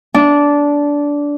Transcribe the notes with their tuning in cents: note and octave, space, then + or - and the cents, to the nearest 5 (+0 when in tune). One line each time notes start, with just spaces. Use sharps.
D4 -15